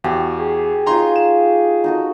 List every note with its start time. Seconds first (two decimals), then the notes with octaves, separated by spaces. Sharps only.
0.04 E2 F#4 G4 G#5
0.39 G#4
0.87 D#4 F4 C#5 A#5 C6
1.16 E7
1.84 D#4 F#4 A4